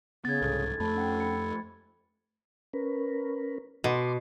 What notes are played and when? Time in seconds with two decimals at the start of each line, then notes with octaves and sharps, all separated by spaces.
0.25 C#3 B3 G#6 A6
0.42 C2 G#2 A4
0.80 F2 A3 A4 A5 B5
0.96 C#4 F#5 G5
1.20 B5 C#7
2.73 C#4 A#4 B4
3.84 B2 C6 D6